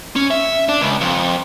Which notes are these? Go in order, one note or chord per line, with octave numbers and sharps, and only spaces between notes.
C#4
E5
D4
C#2
F2